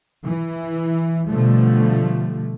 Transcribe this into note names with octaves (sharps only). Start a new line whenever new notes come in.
E3
B2 D3 F3 G3 A3